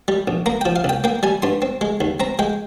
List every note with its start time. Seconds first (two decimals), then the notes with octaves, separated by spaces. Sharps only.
0.08 G3
0.28 A#1
0.46 A#3 A#5
0.61 F3 G5
0.76 F5
0.84 C2 G5
1.04 A#3 G5
1.23 G3 G#5
1.42 G2 C6
1.62 C4
1.81 G#3
2.01 D#2
2.20 C4 A#5
2.39 G#3 G5